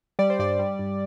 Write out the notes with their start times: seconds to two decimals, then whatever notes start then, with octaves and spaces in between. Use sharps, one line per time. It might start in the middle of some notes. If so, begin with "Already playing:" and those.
0.19 G3 D5
0.30 C5
0.39 G2 D5
0.59 G3
0.79 G2